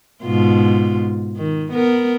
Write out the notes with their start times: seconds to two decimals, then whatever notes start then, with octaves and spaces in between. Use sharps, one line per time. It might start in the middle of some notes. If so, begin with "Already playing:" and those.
0.24 G#2 B2 F4
1.37 D#3
1.72 B3 A#4